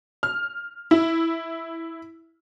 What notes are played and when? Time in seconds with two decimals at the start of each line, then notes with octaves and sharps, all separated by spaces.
0.23 F6
0.91 E4